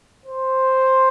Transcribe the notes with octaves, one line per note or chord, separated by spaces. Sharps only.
C5